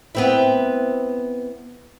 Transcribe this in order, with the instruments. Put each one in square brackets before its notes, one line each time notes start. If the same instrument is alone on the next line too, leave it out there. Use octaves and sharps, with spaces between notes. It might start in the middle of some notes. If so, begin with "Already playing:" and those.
[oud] B3 C4 E4